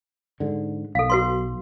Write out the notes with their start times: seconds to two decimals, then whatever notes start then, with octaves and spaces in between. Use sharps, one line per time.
0.40 G#2 D3
0.95 B1 A4 F5
1.10 F#4 B4 C6